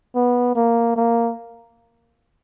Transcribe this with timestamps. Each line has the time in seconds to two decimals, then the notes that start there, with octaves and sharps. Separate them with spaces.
0.15 B3
0.55 A#3
0.96 A#3